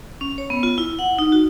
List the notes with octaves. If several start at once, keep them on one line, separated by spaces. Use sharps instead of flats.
C#4
C#5
B3
F4
E4
F#5
D#4
F#4